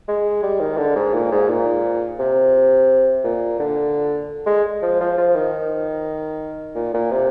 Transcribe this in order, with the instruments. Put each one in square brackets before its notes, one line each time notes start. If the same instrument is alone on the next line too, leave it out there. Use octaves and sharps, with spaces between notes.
[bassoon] G#3
G3
D#3
D3
G#2
A#2
G#2
A#2
C3
A#2
D3
G#3
F3
F3
F3
D#3
A#2
A#2
C3